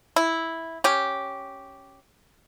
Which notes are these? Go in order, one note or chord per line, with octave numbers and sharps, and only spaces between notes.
E4
C#4 G4